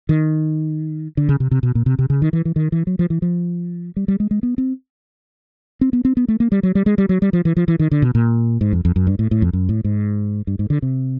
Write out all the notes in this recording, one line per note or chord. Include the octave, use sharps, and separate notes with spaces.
D#3
D3
C#3
C3
C3
B2
A#2
C3
C3
C#3
D#3
E3
E3
D#3
E3
F#3
F3
E3
F3
G3
G3
G#3
G#3
B3
C4
C4
B3
C4
B3
A3
A#3
G3
F#3
G3
G#3
G3
F#3
G3
F3
E3
F3
E3
D#3
D3
B2
A#2
G#2
F2
F2
F#2
G2
A2
A2
F2
F#2
A2
G#2
G2
G#2
D3
C3